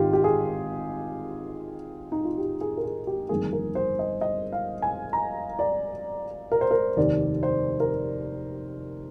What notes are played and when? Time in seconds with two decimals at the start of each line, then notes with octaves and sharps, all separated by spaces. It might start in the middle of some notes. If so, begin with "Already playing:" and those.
Already playing: G#1 G#2 D#3 F4 G4
0.13 G4
0.24 G#4
2.12 D#4
2.24 F4
2.38 G4
2.61 G#4
2.77 A#4
2.83 G#4
3.07 G4
3.29 G1 F2 D#3 A#3 G#4
3.53 A#4
3.75 C5
3.99 D#5
4.21 D#5
4.53 F5
4.82 G#5
5.13 A#5
5.59 D5
6.52 A#4
6.61 C5
6.71 A#4
6.97 F1 D#2 D#3 D5
7.43 C5
7.80 A#4